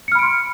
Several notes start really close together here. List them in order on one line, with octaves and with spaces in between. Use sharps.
C#7 F6 B5 D7 C6